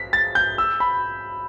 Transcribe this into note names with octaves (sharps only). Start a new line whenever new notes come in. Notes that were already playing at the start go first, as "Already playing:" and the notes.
Already playing: B6
A6
G6
E6
B5